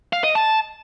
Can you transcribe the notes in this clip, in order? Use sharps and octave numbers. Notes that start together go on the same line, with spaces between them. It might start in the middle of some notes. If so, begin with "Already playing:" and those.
F5
D#5
A5